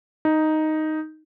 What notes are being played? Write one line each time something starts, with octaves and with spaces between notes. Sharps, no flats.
D#4